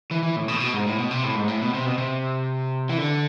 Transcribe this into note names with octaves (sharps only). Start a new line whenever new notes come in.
E3
E3
A2
B2
A2
B2
G#2
A2
B2
C3
A2
G#2
A2
B2
C3
B2
C3
E3
D3